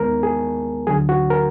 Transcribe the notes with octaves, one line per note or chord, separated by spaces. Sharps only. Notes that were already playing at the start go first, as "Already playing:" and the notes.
Already playing: D#2 D#3 G#3 B3 A#4
G#4
D2 D3 F#3 G#4
F#4
A#4